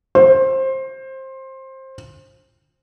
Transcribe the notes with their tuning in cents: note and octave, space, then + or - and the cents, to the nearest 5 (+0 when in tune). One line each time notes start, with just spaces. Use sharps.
C5 +20